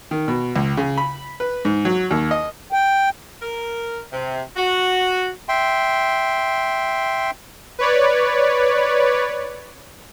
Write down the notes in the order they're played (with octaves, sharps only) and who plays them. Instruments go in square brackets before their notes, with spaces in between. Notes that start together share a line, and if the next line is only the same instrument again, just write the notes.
[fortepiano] D#3
B2
C#2
C#3
B5
B4
G#2
F#3
D#2
D#5
[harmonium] G5
[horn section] A#4
C3
F#4
[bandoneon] E5 G5 C6
[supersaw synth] B4 C#5 D5